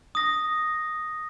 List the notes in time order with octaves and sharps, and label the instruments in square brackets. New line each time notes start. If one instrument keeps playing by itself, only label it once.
[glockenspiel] D#6 A#6